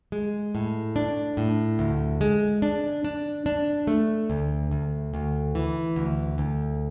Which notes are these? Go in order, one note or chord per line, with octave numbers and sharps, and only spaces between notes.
G#3
A2
D4
A2
D2
G#3
D4
D4
D4
A3
D2
D2
D2
E3
D2
D2